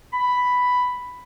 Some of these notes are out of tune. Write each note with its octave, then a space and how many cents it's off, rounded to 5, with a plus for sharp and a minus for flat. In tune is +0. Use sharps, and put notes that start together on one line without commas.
B5 +5